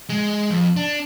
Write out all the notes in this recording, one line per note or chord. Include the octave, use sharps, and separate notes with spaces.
G#3
F2
D4